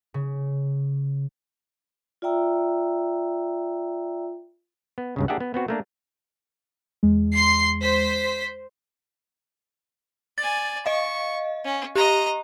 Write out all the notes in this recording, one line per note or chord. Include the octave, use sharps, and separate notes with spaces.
C#3
F4 D5 E5 G5 A#5 E6
B3
C#2 G2 C#3
A#3 D4 G4 G#4 E5 F#5
B3
B3 C4 F#4
A3 A#3 D4
E2 G#3
C6 C7
C5 B6
D5 G#5 A6
D#5 F5 C#6
C#4
G4 D#5 A#5